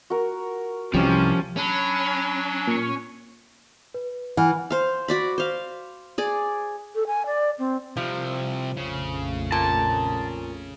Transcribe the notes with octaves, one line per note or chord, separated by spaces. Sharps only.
F#4 A#4
C2 C3 E3 F3 C#4 G4
F#3 C#4 D4 B5
A#2 C#6
B4
E3 F#5 G#5 F6
C5 F5
F#4 D5 B5
C5 F5
G#4 D5
A4
G#5
D5
C4
C3 F3 G3
A#1 F2 C#3 A3
A#2 A5